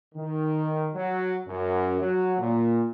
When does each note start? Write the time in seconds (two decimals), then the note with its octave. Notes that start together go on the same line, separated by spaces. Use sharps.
0.15 D#3
0.94 F#3
1.46 F#2
2.00 F#3
2.39 A#2